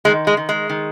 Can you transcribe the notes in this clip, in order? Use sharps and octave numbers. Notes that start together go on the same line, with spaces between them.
D#3 G#3
G#3
D#3
G#3
D#3